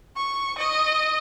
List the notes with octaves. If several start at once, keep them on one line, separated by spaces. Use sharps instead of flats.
C#6
D#5